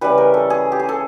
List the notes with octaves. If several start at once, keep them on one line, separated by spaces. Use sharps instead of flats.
C#3 E3 G3 B4
A#4
A4
G#4
G4
G#4
A4